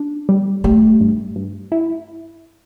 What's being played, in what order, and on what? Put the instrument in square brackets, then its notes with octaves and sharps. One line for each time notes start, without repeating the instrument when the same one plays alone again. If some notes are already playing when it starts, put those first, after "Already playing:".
Already playing: [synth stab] D4
G3
[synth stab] G3 [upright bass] A3
[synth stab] G2
G2
E4